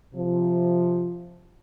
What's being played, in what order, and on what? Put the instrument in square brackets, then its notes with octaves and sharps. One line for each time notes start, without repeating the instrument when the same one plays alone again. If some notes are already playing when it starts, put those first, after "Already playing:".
[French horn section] C3 F3